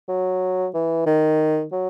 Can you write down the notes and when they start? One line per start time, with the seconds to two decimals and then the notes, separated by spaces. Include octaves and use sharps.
0.08 F#3
0.74 E3
1.06 D#3
1.72 F#3